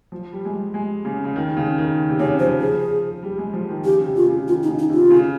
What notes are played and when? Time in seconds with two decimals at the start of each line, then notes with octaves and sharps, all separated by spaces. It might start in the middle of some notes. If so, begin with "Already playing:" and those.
0.12 F3
0.33 G3
0.45 G#3
0.53 G3
0.74 G#3
1.05 C#3
1.24 C#3
1.36 D#3
1.57 C#3
1.78 D#3
2.10 C3
2.19 C#3 C#5
2.39 F3 C5
2.61 G#4
3.23 G3
3.38 G#3
3.53 F3
3.69 D#3
3.85 C#3 G4
4.06 C3
4.16 F4
4.27 C#3
4.47 D#3 F4
4.63 D#4
4.69 C#3
4.79 D#4
4.89 C3 F4
5.10 C#3